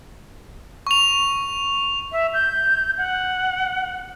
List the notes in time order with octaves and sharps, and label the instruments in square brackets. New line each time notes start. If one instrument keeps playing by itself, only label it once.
[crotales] C#6 F7
[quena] E5
G6
F#5